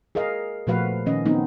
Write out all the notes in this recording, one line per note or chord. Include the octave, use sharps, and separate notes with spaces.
G#4 A#4 D#5 F5
A#2 F3 A3 F#4 B4 F5
D#3 C#4 D#5
F#3 B3 C4 D#4